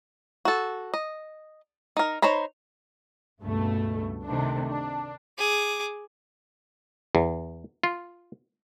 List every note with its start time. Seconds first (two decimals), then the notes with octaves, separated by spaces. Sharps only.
0.45 F#4 A4
0.94 D#5
1.97 D#4 A#4
2.22 D#4 C5 C#5 A#5 B5
3.42 C#2 G2 B2 A3
4.27 C3 D#3 A3 D4
4.67 D4
5.38 G#4 D6
7.15 E2
7.84 F4